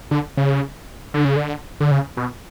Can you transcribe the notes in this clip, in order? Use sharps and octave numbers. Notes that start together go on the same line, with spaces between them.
D3
C#3
D3
C#3
D3
D3
C#3
B2